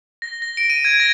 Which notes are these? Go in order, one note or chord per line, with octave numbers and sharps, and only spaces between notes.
A#6
A#6
D7
D#7
G#6
A#6